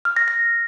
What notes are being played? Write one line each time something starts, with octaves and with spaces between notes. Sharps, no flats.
F6
A#6
A#6